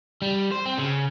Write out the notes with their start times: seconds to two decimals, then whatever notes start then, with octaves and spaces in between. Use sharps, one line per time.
0.22 G3
0.51 C5
0.65 C4
0.78 C#3